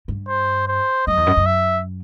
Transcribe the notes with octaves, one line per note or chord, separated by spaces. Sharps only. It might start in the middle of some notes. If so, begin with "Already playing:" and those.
G2
C5
C5
F#2 D#5
E2
F#2
F#2
E5